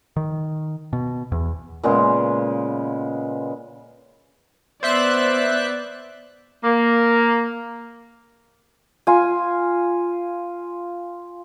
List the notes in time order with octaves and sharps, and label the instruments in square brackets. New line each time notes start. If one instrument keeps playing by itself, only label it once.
[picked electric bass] D#3
B2
E2
[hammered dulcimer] A#2 C#3 G#3 B3
[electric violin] B3 D5 [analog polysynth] C5 E5 F#6
[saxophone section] A#3
[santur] F4 G#5